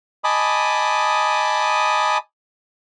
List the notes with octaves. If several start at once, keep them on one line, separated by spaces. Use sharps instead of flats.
D#5 G#5 A5 B5 D6 D#6